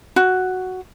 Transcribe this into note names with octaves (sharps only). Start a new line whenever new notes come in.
F#4